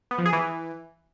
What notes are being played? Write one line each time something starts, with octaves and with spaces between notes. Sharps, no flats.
B3
F3
G#4
E3